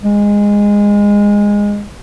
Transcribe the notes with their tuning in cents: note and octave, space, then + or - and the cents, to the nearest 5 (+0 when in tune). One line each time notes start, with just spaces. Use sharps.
G#3 -15